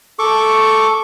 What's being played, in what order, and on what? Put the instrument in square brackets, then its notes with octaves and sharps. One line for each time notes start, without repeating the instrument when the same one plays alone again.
[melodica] A4 C#6 D6